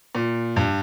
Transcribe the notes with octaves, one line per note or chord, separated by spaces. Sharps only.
A#2
G2